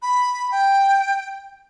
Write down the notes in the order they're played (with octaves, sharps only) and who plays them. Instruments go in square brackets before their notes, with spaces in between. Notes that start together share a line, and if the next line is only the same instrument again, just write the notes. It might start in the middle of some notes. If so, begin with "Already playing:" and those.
[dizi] B5
G5